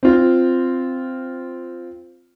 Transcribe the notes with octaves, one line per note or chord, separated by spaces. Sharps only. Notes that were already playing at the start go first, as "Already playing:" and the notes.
C4 F4